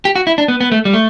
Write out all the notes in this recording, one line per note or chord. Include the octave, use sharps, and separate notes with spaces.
G4
F#4
E4
D4
B3
B3
A3
G3
A3